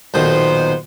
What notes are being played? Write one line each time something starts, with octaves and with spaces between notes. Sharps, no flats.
B1 A#2 D#3 B3 D#4 C5